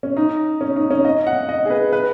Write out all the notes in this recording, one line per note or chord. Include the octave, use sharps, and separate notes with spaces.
C#4
D#4
C#4
D#4
C#4
D#5
F#5
D#5
G#4
B4
B4